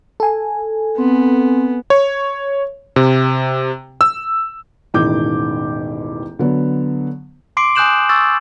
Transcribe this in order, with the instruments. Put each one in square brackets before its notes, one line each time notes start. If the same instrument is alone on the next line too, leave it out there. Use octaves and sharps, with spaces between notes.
[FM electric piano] A4 G#5
[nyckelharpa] B3 [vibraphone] C4
[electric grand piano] C#5
C3
E6
[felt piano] E1 A1 D#3 E4 D6 G6
D3 F#3 B3
[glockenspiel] C6 D6 C7 D7
G#5 D#6 F#6 G6 E7 F#7
C#6 E6 A6